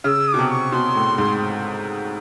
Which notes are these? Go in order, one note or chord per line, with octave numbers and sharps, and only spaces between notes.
C#3 E6 F6
D#6
B2 D6
C3
C#6
B2 C6
A2
G#2